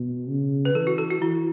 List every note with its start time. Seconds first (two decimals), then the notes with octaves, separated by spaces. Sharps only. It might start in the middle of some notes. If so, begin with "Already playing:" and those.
Already playing: B2
0.28 C#3
0.65 B4
0.75 E3 A4
0.87 F#4
0.98 A4
1.10 F#4
1.21 E3 E4